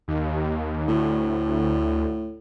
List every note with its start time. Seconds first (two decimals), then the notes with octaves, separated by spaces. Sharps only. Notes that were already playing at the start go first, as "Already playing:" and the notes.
0.08 D#2
0.88 D2 A2